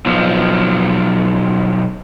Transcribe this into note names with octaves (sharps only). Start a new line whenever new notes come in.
B1 F3